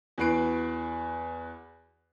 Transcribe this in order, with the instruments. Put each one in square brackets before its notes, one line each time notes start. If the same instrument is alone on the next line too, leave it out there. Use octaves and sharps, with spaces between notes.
[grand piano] E2 F#4 B4 C7 D7